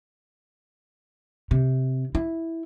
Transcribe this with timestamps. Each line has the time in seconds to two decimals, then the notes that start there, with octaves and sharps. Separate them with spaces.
1.51 C3
2.15 E4